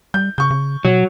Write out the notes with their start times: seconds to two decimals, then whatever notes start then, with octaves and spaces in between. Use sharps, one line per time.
0.14 G3 G6
0.38 C#3 C#6 G6
0.51 C#3
0.85 B2 F#3